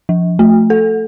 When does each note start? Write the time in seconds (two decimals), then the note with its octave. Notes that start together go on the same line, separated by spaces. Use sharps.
0.09 F3
0.39 A3
0.70 A4